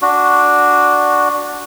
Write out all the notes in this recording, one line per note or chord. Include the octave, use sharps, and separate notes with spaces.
D4 F#4